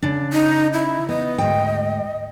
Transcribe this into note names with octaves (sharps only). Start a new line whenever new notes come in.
C#3 D4
D#4
E4
B3 D#5
D2 G#2 G5